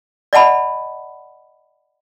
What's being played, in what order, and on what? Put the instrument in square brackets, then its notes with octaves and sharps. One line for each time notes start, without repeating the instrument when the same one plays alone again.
[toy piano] D5 D#5 F#5 A5 B5